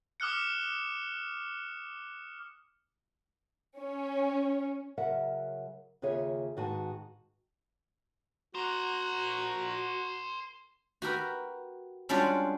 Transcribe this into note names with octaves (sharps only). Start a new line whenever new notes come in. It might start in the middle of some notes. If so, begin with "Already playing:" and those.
D6 D#6 F6 F#6 C#7
C#4
C#3 F#3 A#4 E5 F#5
D#2 C#3 F4 G#4 C#5 E5
G#2 D#3 F#4 B4 G#5 A5
F#4 A#4 C5 F#5 A#5
F#4 G4 A#4 B4
G3 G#3 C#4 D4 F4 F#4